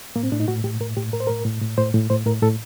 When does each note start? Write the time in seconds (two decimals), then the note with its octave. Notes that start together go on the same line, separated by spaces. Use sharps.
0.16 A2 A#3
0.23 C4
0.32 A2 D4
0.40 D#4
0.48 A2 F#4
0.64 A2 G4
0.80 A2 A#4
0.96 A2 G4
1.13 A2 A#4
1.20 C5
1.27 A2 A#4
1.45 A2
1.62 A2
1.77 A2 C5
1.94 A2
2.10 A2 C5
2.26 A2 A#4
2.42 A2 A4